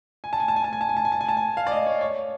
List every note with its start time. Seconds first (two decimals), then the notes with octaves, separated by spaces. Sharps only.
0.24 G#5
0.33 A5
0.40 G#5
0.48 A5
0.56 G#5
0.64 A5
0.73 G#5
0.81 A5
0.89 G#5
0.97 A5
1.05 G#5
1.12 A5
1.21 G#5
1.29 A5
1.37 G#5
1.57 F5
1.67 D5
1.71 D#5
1.86 C#5
2.01 C#5